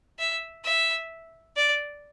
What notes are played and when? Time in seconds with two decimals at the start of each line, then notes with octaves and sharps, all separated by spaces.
0.19 E5
0.64 E5
1.56 D5